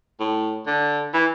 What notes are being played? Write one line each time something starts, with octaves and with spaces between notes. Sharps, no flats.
A2
D3
E3